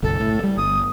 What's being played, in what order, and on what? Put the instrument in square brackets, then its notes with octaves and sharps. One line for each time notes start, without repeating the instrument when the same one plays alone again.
[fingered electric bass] F#1 B1 [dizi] A4
[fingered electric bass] A2
G3
[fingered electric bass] G1 [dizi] D#6